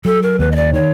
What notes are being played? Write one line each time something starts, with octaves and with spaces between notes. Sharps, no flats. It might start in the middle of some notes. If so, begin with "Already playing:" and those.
F#3 A4
A#4
D#2 B4
D#5
D5
D#3 C#5